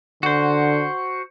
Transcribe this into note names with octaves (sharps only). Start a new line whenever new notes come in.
D3 F#4 C5